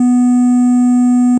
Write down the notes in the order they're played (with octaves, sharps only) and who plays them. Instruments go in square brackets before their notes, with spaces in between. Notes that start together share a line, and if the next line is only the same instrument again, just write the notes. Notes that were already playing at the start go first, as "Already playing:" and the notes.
Already playing: [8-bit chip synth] B3